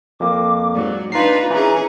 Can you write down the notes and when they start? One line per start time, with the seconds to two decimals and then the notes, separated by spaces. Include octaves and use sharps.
0.20 F2 A#3 D6
0.74 G#2 F#3 D5
1.12 D4 D#4 F4 B4 A#5 C7
1.51 E3 C#4 G#4